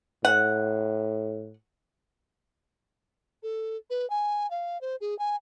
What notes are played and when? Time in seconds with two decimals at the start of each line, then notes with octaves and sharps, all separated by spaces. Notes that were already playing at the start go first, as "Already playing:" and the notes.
0.25 A2 F#5
3.43 A4
3.90 B4
4.10 G#5
4.51 F5
4.81 C5
5.01 G#4
5.19 G#5